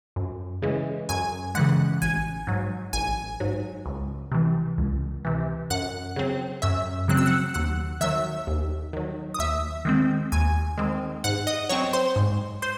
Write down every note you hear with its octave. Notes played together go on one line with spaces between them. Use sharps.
F#2
C#3 E3 G#3
F#2 G#5 G#6
C#3 E3 G#3 F#5 F#6
A1 G#5 G#6
G#2 F#3
A1 G#5 G#6
G#2 F#3
C#2
C3 E3
C#2
C3 E3
F#2 F#5 F#6
C#3 F#3 C4
F#2 E5 E6
C#3 F#3 C4 F#6
E6
F#5 F#6
D#2 F#5 F#6
D#3 F#3 E5 E6
D#2
D#3 F#3
D#6
D#2 E5 E6
D#3 G#3 C4
D#2 G#5 G#6
D#3 G#3 C4
G#2 F#5 F#6
D#5 D#6
F#3 C4 C#5 C#6
C5 C6
G#2
C5 C6